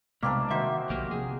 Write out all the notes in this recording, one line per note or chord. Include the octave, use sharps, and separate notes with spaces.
C2 B2 G#3 A#3 C4 D4 D6 F6
D#3 D#4 F#4 C5 E5
B1 D3 F3 A#3 G4
C3 F3 G#4